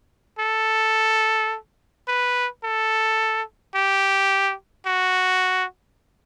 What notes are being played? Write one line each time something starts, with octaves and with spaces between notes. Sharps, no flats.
A4
B4
A4
G4
F#4